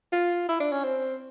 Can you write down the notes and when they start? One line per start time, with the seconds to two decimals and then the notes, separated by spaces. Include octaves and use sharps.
0.12 F4
0.49 E4
0.60 D4
0.72 C#4
0.84 C4